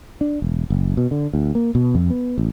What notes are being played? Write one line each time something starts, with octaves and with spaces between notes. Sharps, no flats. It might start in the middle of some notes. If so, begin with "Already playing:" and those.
D4
E1
F#1
B2
D3
D2
A#3
B2
F2
B3
A1